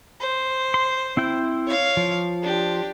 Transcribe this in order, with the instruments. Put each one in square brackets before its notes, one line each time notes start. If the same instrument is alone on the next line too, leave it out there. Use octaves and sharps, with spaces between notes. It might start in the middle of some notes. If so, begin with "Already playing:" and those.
[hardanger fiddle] C5
[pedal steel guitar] C6
C4 E4 G5
[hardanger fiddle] C#5 F5
[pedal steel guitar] F3
[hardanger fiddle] D4 G4